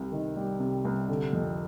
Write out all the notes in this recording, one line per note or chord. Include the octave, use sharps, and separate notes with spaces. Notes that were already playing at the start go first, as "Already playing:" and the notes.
Already playing: C2 C3
D#3
G3
C3
C2
D3
F2